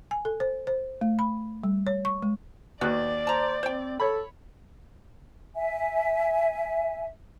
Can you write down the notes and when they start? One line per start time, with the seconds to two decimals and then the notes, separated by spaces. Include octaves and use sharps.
0.11 G#5
0.25 A4
0.40 C5
0.67 C5
1.01 A3
1.19 B5
1.64 G3
1.87 C#5
2.05 C#6
2.22 G#3
2.81 D#2 B3 F#4 D5 F#6
3.27 C5 A5 A#5
3.63 C4 C5 G5
4.00 A4 C#5 B5
5.56 E5 G#5